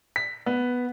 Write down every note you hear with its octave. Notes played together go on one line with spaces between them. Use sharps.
B6
B3